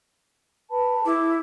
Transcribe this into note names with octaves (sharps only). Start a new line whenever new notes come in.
B4 A5 B5
E4 G#4 D6